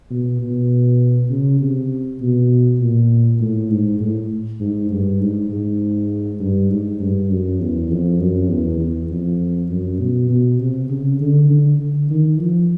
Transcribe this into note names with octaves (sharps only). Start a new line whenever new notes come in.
B2
B2
C#3
C3
B2
A#2
A2
G#2
A2
G#2
G2
G#2
G#2
G2
G#2
G2
F#2
E2
F2
F#2
E2
E2
F2
F#2
B2
B2
C3
C#3
D3
D3
D3
D#3
F3